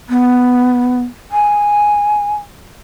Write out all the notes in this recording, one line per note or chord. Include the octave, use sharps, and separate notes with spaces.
B3
G#5